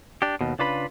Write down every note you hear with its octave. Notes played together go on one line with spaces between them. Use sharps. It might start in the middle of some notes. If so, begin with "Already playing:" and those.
D4 G4
D#2 B2
C#3 D4 F4 B4 B5